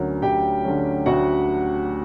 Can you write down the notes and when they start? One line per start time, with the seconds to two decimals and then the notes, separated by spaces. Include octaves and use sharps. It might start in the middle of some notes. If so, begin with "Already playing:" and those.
Already playing: D2 D3 F#3 C#4 A#4
0.22 D2 G4 G5
0.65 D3 F#3 C#4
1.06 D2 F#4 F#5